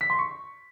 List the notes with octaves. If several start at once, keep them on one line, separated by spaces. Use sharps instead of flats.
B6
C6
C#6